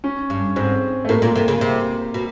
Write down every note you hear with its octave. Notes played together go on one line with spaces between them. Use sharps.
C#4
G2
G#2 C4
A3
A2 A#3
A#2
C3
C#3
C3
B2